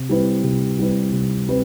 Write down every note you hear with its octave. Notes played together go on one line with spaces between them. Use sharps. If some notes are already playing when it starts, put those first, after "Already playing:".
Already playing: C3
G3 C4 E4 B4
C3
G3 C4 E4 B4
C3
G3 C4 B4